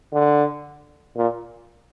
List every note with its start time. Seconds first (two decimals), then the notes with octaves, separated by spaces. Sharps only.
0.13 D3
1.16 A#2